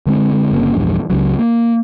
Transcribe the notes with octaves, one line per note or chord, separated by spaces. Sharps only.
D3 G#3 C4
G1 C#3 A#3 C4
A#1 E2 G2
C#2 C#3 F#3
A#3